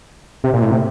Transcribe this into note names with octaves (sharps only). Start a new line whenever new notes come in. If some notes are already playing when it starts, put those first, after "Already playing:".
C3
A#2
A2
C3